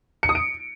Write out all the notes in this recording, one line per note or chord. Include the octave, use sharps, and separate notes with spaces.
C#7
D#6
D7